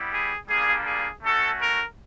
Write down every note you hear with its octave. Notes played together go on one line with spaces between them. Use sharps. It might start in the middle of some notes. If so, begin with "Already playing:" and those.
Already playing: G3 B3 E4
G#4
G3 A#3 D4 F4 G#4
G#4
A3 C#4 F#4 A4
A#4